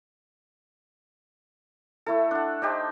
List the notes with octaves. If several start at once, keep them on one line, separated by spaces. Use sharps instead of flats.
A3 E4 A4
D4 F#5
D4 D#4 G4 C5